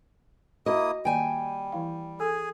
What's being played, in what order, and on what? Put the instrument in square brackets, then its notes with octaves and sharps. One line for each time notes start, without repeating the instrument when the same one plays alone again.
[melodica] A#3 E4 D#6 [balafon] F#4 [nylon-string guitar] D#5
[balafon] D#3 A#3 D5 [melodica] G3 [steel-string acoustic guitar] G5 G#5
[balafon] E3 E4 F5
[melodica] G#4 G#5 [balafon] A4